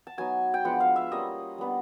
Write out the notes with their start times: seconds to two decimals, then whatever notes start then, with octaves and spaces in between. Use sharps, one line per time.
0.07 A5
0.18 F#3 B3 D#4 G#5
0.54 G5
0.64 F3 G#3 B3 D4 F#5
0.80 F5
0.96 E5
1.12 G3 A#3 C#4 F4 D#5
1.58 G3 B3 D4